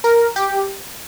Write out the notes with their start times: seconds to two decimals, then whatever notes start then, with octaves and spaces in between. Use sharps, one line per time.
0.04 A#4
0.36 G4